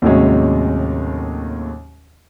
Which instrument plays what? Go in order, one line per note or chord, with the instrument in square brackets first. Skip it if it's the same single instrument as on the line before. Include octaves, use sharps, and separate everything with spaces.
[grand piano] D#2 A2 C3 F#3 G#3 C#4